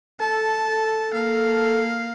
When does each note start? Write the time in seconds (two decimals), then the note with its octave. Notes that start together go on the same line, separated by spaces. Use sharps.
0.20 A4 A5
1.13 A#3 F5